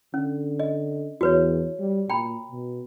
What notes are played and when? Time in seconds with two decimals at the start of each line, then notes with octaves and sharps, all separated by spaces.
0.14 D3 C#4
0.60 D#5
1.21 E2 F#4 B4 C#5
1.79 G3
2.10 A#2 G5 A#5 B5
2.51 B2